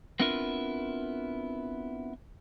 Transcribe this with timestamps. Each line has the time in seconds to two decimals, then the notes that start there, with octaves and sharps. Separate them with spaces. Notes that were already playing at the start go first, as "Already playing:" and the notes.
0.20 B3 C4 D4 E4 F4 A#4